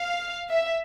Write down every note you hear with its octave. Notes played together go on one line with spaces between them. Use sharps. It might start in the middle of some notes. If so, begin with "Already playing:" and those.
Already playing: F5
E5